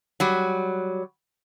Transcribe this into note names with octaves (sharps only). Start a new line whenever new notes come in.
F#3 G3